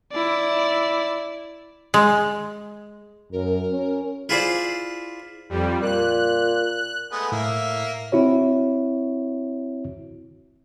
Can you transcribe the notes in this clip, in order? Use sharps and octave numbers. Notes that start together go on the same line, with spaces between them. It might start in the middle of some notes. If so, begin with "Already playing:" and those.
E4 D5
G#3
F#2 A#4
C#4
E4 F4 G#4 C5 D5
F2 G3
A#2 F#6
G#3 A3 B3
A2 A#3 E5
C4 E4 F#4 C#5